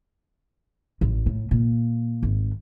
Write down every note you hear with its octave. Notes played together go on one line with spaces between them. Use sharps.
A1
A2
A#2
G#1